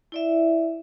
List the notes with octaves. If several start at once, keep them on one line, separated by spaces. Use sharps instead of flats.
E4 D5 E5